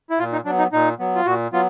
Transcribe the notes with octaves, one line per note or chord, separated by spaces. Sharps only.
E4
A#2 F4
D#4
F#3 B3 D4
D#4
A#2 D#4
F#3 B3
F4
A#2 F#4
F#3 B3 F4